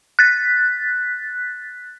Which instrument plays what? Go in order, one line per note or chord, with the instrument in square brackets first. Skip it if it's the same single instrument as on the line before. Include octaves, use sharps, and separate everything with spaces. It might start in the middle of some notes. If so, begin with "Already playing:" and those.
[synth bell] F#6 A6 B6